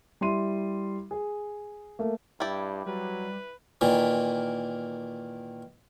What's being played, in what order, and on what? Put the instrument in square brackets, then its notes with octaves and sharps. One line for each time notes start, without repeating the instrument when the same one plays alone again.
[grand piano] G3 E4 C6 D#7
G#4
A3 A#3
[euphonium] G2 [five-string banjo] E4 G4 D5
[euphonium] F#3 [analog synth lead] G3 [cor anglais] B4
[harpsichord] A#2 D#3 E3